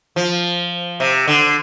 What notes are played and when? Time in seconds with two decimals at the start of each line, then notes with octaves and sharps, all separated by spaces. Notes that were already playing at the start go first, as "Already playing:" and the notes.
0.16 F3
1.00 C3
1.28 D3